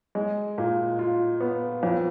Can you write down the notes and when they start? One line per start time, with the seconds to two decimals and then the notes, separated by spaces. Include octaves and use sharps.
0.15 G#3
0.58 A#2
0.99 F4
1.41 B3
1.83 F2